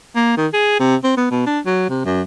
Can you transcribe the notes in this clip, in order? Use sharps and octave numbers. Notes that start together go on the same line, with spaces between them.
A#3
D#3
G#4
C3
C4
B3
B2
D4
F#3
C3
F#2